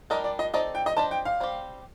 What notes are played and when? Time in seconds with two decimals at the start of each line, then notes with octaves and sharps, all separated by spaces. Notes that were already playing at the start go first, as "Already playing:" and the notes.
0.10 G3 D4 G4 A#4 D#5
0.24 D5
0.39 D#5
0.53 C4 D#4 A4 D5 D#5
0.75 G5
0.86 D#5
0.97 D4 G4 C5 D#5 A5
1.11 G5
1.25 F5
1.40 G3 C4 G4